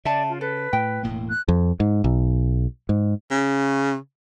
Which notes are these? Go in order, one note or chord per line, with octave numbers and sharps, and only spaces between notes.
C#3 D5 E5 A5
F4
A4 B4
A2 G5
E1 A2 A#3
F#6
F2
G#2
B1
G#2
C#3